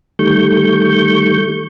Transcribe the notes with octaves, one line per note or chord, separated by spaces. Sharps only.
D#3 G3 A3 C#6 G6